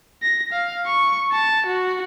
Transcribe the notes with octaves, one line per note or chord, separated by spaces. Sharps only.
A#6
F5
C#6
A5
F#4